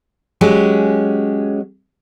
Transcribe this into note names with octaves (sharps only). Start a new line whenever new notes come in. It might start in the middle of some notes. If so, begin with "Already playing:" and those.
F#3 G#3 C#4 G4